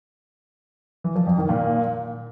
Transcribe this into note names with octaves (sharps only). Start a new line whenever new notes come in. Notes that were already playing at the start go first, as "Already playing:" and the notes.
E3
F3
F2
D#3
A#2